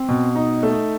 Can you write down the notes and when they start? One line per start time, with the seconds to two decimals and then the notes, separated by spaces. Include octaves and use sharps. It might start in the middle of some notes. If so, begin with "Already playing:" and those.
Already playing: C4
0.08 B2
0.35 D#4
0.63 A3